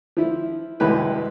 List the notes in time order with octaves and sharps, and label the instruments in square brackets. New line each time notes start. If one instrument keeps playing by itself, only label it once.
[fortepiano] F3 E4
C2 F#2 G#3 E4 G4 B4